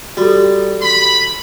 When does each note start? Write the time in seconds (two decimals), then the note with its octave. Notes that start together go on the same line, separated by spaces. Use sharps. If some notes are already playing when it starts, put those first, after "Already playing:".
0.17 G3 F#4 A4
0.82 B5 C6